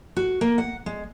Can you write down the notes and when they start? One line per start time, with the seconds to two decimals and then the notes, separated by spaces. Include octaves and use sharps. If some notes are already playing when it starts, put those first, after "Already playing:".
0.16 F#4
0.41 A#3
0.58 F#5
0.86 G#3